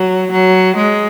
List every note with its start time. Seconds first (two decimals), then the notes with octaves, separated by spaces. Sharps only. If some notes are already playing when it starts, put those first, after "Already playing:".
Already playing: F#3
0.32 F#3
0.76 G#3